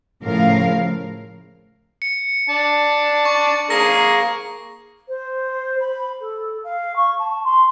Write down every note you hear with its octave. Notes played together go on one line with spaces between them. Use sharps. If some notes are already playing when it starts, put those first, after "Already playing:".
A2 C#3 F3 A#4 F5
C#7
D4 A5
C#6
A#3 G#4 A#4 A#6
C5
B5
A4
F5
C#6
A5
C6